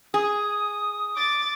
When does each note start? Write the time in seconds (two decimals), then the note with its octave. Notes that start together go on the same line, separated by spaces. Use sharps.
0.14 G#4 D#6
1.16 D6 A6